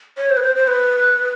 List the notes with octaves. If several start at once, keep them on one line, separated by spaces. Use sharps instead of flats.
C#5
C5
B4
C5
C5
B4